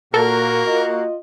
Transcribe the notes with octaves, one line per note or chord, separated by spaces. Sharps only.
A#2 A#3 F#4 A4 A#4
F4 D#5